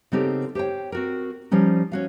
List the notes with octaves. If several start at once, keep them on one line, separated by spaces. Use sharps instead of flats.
C#3 B3 C4 D#4 G4 A4
G4 C5 C#5 G5
C4 F#4 A#4
F3 G3 C#4 D#4
C#4 F#4 F5